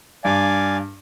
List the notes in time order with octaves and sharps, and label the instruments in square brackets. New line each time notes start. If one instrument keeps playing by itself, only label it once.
[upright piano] G2 [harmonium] D5 F5 G#5